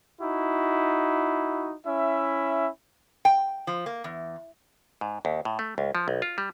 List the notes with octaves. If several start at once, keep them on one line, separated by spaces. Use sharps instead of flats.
D#4 E4 F#4
C#4 E4 E5
G5
F3
A#3
E2
G#2
D#2
A2
A3
C#2
F3
B1
F4
G3